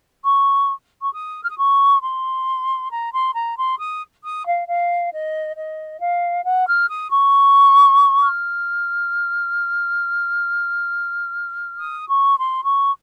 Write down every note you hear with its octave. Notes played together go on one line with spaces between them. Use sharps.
C#6
C#6
D#6
F6
D#6
C#6
C6
A#5
C6
A#5
C6
D#6
D#6
F5
F5
D#5
D#5
F5
F#5
F6
D#6
C#6
F6
D#6
C#6
C6
C#6